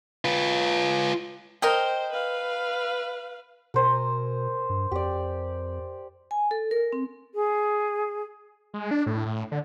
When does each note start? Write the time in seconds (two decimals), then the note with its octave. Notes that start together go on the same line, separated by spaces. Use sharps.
0.25 F4 B4
1.62 A#4 C5 D#5 G5
2.12 B4 F5
3.74 B2 A#4 C5 G#5
4.69 G2
4.91 F2 G4 D5
6.31 G#5
6.51 A4
6.71 A#4
6.93 C4
7.35 G#4
8.74 G#3
8.91 D4
9.06 A2
9.26 A2
9.52 D3